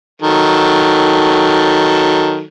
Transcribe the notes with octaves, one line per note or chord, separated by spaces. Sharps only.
D#3 F#3 A4